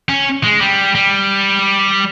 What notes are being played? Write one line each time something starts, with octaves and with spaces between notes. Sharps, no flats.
C#4
G#3
G3
G3